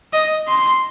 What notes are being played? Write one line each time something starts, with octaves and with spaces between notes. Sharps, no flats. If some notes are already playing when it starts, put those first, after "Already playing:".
D#5
C6